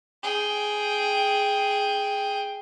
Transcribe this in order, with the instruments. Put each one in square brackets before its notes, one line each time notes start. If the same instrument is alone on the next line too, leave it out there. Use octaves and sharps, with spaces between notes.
[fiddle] G#4 G5